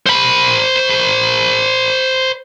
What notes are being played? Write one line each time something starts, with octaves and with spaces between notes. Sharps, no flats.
C5 B5